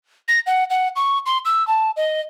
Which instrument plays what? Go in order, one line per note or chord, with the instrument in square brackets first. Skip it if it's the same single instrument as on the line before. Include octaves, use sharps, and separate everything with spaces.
[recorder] A#6
F#5
F#5
C#6
C6
E6
A5
D#5